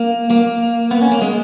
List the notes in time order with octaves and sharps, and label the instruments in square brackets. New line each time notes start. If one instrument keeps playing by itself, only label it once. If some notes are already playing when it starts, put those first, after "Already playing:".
Already playing: [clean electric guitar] A#3
A#3
B3
C#4
A#3
G#3